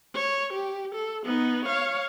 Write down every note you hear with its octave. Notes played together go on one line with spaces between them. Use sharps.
C#5
G4
A4
B3 D#4
C#5 F5